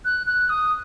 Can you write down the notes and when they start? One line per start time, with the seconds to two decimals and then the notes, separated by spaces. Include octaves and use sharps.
0.05 F#6
0.27 F#6
0.49 D#6